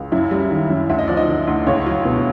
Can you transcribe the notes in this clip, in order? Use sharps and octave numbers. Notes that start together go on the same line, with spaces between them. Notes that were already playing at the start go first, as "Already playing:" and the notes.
Already playing: C#2
F#2 E4 E5
G3
D#3
F#2
D2 E5
D#5
F3 D5
D#4 D#5
D3
D2
C#2 C#5
F#3
B2